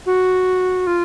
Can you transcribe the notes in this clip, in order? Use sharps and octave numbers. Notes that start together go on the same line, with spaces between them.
F#4
F4